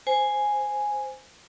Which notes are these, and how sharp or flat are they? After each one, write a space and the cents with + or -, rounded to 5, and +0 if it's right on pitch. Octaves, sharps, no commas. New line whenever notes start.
C5 +0 G#5 +0